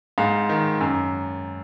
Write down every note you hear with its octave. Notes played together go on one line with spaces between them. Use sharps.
G#2 F5
D#3
F#2